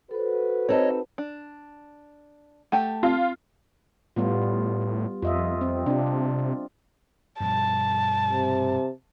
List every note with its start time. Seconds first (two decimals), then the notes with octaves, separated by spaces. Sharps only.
0.11 F#4 A4 B4 C5
0.69 C4 D#4 A4 C#5 D#5
1.18 D4
2.72 A3 G4 F#5 A5
3.03 C4 F4
4.16 A2 G3 B3 F4
5.22 F2 F4 D#5 E5
5.61 C4
5.86 C3 D4 F4
7.40 G2 B2 F3 A5
8.30 C3